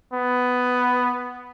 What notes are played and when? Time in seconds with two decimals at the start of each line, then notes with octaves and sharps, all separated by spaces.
0.13 B3